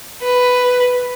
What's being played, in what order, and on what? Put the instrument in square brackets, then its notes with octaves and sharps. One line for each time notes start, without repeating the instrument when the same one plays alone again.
[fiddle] B4